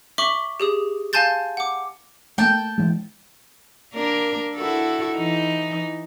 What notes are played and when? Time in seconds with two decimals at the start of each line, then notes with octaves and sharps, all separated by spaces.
0.18 E5 C#6 D6 B6 F#7 G7
0.60 G4 G#4 D#6
1.13 F5 G#5 A5 C6 G6 A6
1.57 F#5 D6
2.38 A3 A#3 G5 A5
2.78 E3 G#3
3.93 A#3 D4 A#4
4.56 E4 F#4 A4
5.16 E3 D#4